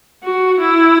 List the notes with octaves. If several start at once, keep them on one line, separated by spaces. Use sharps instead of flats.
F#4
E4